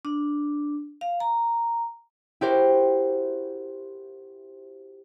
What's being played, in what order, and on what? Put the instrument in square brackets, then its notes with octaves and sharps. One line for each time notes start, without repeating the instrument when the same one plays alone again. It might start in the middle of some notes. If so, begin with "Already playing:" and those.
[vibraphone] D4
F5
A#5
[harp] E4 F#4 G4 A#4 C5